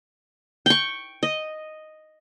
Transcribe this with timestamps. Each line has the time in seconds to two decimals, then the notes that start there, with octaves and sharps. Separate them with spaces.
0.66 G5 C#6
1.23 D#5